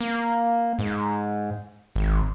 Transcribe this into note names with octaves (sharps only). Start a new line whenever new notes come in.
A#3
G#2
G#1